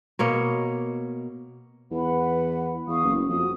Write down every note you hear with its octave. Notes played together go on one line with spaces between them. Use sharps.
B2 A#3 C#5 D#5
E2 B4 F#5 B5
E2 F5 C#6 D#6
F#1
F2 F#4 D#6